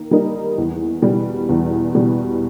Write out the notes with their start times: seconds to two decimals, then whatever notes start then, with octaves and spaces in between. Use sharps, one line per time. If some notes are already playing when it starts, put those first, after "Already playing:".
Already playing: D#3 A#3
0.11 G3 A#3 D#4
0.58 E2
1.02 B2 G3
1.49 E2
1.95 B2 G3